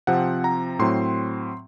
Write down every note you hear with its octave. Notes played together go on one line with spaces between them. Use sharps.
C3 F3 C4 F#5
A#5
A2 F#3 C4 C6